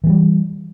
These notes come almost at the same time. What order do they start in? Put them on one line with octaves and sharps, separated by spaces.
E3 A3 G3